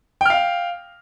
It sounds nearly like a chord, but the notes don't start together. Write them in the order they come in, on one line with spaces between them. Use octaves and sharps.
G5 F6 F5